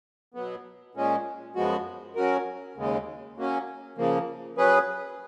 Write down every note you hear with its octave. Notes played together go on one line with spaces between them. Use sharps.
B2 F#3 B3
A#2 G#3 C#4
F#2 F3 G#3 B3 F#4
F#3 C#4 F#4 A#4
D#2 C#3 G#3
F#3 A#3 C#4
C#3 F3 A#3
F#3 C#4 G#4 B4